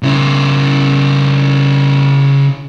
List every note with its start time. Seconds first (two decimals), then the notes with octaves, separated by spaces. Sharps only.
0.03 C#3 E4